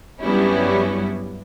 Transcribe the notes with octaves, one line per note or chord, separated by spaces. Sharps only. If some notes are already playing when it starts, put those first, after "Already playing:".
G2 F#3 G3 B3 C#4 E4